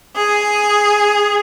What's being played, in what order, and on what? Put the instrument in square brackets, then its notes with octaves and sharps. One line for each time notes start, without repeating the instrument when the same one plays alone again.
[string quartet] G#4